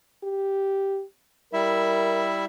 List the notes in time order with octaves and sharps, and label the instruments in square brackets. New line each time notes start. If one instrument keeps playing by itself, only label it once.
[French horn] G4
[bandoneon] G3 E4 E5 [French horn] A#4